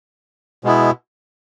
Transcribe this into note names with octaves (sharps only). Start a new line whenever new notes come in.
B2 G#3 B3 E4